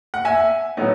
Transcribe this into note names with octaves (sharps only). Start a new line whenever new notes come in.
F#5
E5 G#5
A2 F#3 B3 D#4